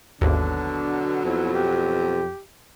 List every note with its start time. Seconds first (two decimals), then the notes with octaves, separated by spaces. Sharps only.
0.21 G#1 D#2 B2 D3 F#3 D4
1.25 F2 E4
1.53 G4